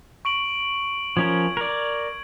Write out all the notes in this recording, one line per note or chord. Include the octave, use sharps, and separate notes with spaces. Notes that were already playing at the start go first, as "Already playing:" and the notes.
C#6 D7 F#7
F3 C#4 A#4 G#6
A#4 D5